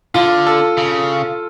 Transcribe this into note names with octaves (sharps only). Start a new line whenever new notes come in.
D3 F4
A4
C#3